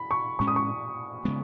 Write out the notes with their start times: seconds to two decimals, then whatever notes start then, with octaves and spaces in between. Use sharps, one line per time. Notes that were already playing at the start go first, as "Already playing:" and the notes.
Already playing: B5
0.11 C#6
0.39 A2 G#3 C#4 C#6
0.47 D#6
0.56 C#6
1.25 C#3 G#3 B3